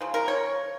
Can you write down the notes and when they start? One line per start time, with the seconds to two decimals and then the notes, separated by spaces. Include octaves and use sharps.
0.01 C#3 F3
0.14 A#4
0.28 C#5